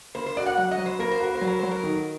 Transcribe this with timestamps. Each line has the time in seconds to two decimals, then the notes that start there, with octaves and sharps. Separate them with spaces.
0.15 A#3 C5
0.26 C5
0.37 F#4 D5
0.46 F#5
0.57 F#3 F#5
0.71 D#5
0.78 F#3
0.86 C5
0.99 A#3 A#4
1.11 C5
1.20 F#4 A#4
1.35 C5
1.41 F#3
1.48 A#4
1.59 F#3 C5
1.71 A#4
1.84 D#3